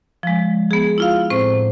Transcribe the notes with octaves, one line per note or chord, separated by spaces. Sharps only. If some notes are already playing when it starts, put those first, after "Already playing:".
F3 G#3
B3 G#4
E4 F4 F5
A2 C4 C5